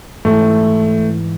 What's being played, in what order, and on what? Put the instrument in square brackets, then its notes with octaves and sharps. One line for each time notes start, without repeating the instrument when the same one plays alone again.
[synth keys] G#2 E3 [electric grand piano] A3